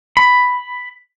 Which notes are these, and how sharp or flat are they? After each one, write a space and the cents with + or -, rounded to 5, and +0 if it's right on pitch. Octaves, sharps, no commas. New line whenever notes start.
B5 +5